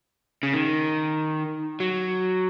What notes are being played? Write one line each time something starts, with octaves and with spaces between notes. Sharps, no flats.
C#3
D#3
F#3